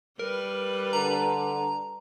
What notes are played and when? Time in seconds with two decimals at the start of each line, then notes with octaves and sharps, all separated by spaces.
0.19 G3 A#4 B4
0.93 D3 A#5